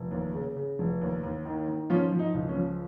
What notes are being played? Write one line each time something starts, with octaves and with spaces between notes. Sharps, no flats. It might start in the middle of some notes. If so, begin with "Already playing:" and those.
Already playing: F1
D#2
C#3
C#3
F1
D#2
D#2
D#3
D#3
F3 C#4 F4
F3
D#4
C#2
C#4
F3